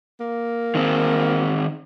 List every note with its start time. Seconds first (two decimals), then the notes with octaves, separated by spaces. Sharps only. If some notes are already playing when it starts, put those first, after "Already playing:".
0.20 A#3
0.75 D#3 C4